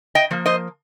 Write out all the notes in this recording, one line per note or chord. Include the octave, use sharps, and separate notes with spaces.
D#5 G5
F3 A#3
C5 D#5